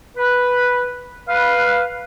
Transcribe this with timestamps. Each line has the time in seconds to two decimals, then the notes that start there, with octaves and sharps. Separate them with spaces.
0.17 B4
1.29 B4 F5